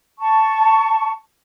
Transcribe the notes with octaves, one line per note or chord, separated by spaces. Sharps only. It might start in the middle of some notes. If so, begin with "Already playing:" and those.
A5 C#6